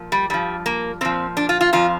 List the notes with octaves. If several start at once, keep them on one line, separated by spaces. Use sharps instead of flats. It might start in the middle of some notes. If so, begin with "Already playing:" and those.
Already playing: A#2 F3
G3
G2 F3 G3
A#3
A#2 F3 C4
D4
F4
F4
F2 F3 F4